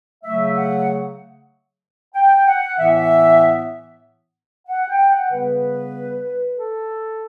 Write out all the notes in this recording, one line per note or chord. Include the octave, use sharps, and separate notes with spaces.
C#3 F#3 A3 E5
F#5
G5
F#5
A2 E3 B3 E5
F#5
G5
F#5
C#3 G3 B3 B4
A4